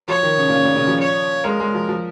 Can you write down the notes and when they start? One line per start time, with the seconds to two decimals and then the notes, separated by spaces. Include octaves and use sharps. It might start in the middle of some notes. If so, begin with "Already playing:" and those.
0.08 F3 C#5
0.23 D#3
0.38 C#3
0.49 A#2
0.54 C#3
0.64 A#2
0.76 C#3
0.87 F3
0.99 C#5
1.44 G#3 A#4
1.60 G#3
1.75 F3
1.89 F3